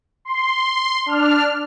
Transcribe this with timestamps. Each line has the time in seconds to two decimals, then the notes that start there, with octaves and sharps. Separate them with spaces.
0.25 C6
1.06 D4 F6